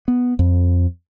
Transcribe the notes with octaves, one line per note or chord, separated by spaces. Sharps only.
B3
F2